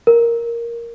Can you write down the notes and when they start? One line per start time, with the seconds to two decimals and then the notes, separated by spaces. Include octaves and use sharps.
0.07 A#4